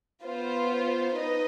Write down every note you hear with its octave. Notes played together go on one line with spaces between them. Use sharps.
B3 F4 C5
D#4 B4 D#5